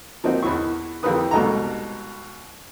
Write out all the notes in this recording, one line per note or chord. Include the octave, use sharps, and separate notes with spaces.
F3 A#3 C4 D#4 F#4
E2 E3 C#6
F2 E3 G4 A#4 B4 D#6
C2 G#2 B2 D#4 A4 A#5